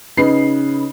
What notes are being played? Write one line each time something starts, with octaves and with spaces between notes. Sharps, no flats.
C#3 D#4 B4 C7